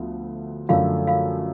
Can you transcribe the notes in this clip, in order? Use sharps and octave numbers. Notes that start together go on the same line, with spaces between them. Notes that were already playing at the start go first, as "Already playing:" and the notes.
Already playing: D2 F3 B3
F#2 D3 F3 A3 F4 F5
F4 F5